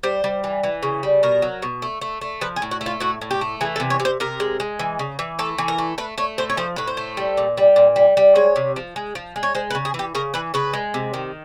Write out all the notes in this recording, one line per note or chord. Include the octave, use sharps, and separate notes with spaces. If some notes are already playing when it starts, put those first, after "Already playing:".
G3 C5
G3
E3
E3
C#3
G3
B2 A#4
F#3
B2
A3
A3
A3
F3 B4
G#4
A2
F#4
A3
F4
A2 F#4
A2
G4
A3
E3 G#4
A4
C3
C#5
C3
C5
C3 A#4
G#3
G#3
E3
C#3
E3
A3 A4
E3
A#4
A3
A3 B4
A3 C#5
A2 C5
C#5
F3 C5
A2 B4
C5
A3
G3
A#2
G3
A#2
G3
G3
G#3 C#5
C3
F3
G#3
F3
G#3
C#5
G#3 C5
B4
C#3
G#4
E3
G4
C#3 A#4
E3 B4
C#3 B4
G#3
C3
D#3